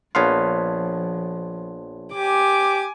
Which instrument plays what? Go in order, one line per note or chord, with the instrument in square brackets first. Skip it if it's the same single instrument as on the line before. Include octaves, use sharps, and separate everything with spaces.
[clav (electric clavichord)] A#1 B3 F5 [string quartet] F3 [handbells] C#5 A5 C6
[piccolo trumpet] G4 [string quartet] G#5 D6